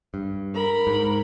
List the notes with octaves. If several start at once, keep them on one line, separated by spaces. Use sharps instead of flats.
G2
A#4 B5
G#2